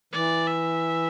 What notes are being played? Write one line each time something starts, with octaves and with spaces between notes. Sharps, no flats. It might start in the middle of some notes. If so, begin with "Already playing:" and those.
E3 D5
E5